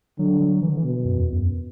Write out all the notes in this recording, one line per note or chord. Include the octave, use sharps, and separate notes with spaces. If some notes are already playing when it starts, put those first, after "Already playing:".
D3 F#3
F#3
E3
D3
E3
B2
F#2
E2
F#2